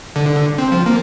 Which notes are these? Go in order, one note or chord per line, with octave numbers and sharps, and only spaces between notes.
D3
C4
F3
A#3